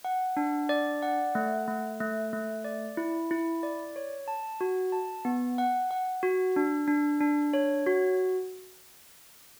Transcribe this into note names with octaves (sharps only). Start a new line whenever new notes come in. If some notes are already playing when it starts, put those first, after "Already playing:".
F#5
D4
D5
F#5
A3
A3
A3
A3
D5
E4
E4
D5
C#5
A5
F#4
A5
B3
F#5
F#5
F#4
D4
D4
D4
C#5
F#4